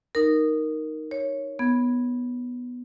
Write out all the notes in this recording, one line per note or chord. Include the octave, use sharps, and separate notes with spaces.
D#4 A#4
C#5
B3 G#6